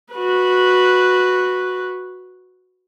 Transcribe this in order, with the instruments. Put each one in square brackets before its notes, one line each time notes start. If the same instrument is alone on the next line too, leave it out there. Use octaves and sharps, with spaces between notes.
[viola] F#4 B4